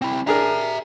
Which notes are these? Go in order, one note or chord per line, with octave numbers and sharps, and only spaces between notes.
C4 E4
D4 G#4 A#4 E5 A#5